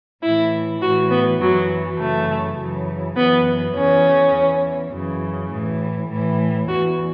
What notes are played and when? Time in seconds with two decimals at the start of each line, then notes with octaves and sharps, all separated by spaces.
0.23 A2 E3 E4
0.81 A2 E3 F#4
1.10 B3
1.40 F#2 E3 F#3
1.98 F#2 C#3 E3 A3
2.57 F#2 C#3 E3
3.16 F#2 E3 B3
3.74 E2 C#3 E3 C#4
4.33 E2 E3
4.92 F#2 C#3 E3
5.50 A2 E3
6.09 A2 E3
6.68 E2 E3 F#4